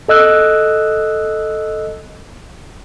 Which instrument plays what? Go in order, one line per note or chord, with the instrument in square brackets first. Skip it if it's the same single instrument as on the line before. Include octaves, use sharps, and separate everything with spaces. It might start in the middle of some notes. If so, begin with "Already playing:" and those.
[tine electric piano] A4 D#5 E6 F#6